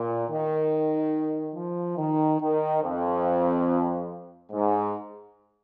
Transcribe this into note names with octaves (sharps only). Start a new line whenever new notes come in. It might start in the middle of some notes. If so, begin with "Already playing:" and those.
Already playing: A#2
D#3
F3
D#3
D#3
F2
G#2